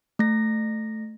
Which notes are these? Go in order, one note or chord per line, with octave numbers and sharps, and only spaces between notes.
A3 A#6